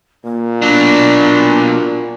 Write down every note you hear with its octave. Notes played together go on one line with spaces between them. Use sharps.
A#2 A#3
B2 F#3 D4